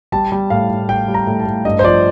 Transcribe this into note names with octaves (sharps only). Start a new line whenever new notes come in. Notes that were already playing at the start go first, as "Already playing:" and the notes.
G3 A5
G3
A2 F5
A2
A2 G5
G3
A#5
A2
A5
A2
G2 D#5
C5
F3 D5